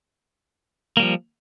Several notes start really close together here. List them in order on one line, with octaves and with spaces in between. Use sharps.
A#3 G3 F3